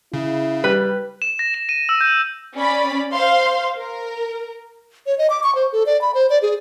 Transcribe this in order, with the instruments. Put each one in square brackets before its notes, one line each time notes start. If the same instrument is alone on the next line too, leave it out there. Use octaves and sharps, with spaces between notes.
[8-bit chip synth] C#3 [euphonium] E4
[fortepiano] G3 [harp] B4
[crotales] E7
A#6
E7
D#7
E6
G6
[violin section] C#4 D5 B5
C5 F5 C6
A#4
[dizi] C#5
D#5
D6
C#6
C5
A4
D5
B5
C5
D5
G#4